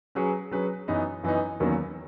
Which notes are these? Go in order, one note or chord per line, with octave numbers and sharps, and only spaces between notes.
F#3 C#4 G#4 B4
F#3 C#4 G#4 B4
F#2 E3 B3 D#4
F#2 E3 B3 D#4
E2 D#3 F#3 A#3 C#4